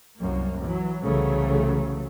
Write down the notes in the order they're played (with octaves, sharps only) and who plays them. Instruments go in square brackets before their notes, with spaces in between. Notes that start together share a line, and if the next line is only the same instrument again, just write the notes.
[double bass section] C2 F#2 A#3
E3 F#3
C2 C#3 E3 F#3 A3